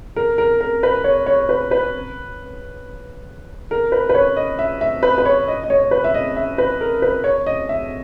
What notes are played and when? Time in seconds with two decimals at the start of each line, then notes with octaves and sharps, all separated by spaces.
0.16 A#4
0.38 A#4
0.61 A#4
0.83 B4
1.04 C#5
1.26 C#5
1.49 B4
1.71 B4
3.71 A#4
3.92 B4
4.09 B4
4.15 C#5
4.37 D#5
4.59 E5
4.81 E5
5.03 B4
5.18 B4
5.25 C#5
5.48 D#5
5.64 D#5
5.70 C#5
5.91 B4
6.04 E5
6.14 D#5
6.37 E5
6.58 B4
6.81 A#4
7.02 B4
7.24 C#5
7.46 D#5
7.69 E5